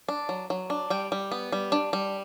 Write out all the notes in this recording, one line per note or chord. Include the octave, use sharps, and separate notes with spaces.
D4
F#3
F#3
D4
G3 G5
G3
B3
G3
D4
G3